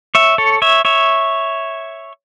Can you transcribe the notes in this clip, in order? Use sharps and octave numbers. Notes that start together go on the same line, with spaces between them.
C#5 E5
A4 C#5
C#5 E5
C#5 E5